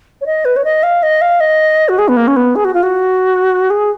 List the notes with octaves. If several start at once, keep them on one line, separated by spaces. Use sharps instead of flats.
C#5
D#5
B4
C#5
D#5
F5
D#5
F5
D#5
F#4
G#4
B3
A#3
C#4
B3
G#4
F#4
F4
F#4
G#4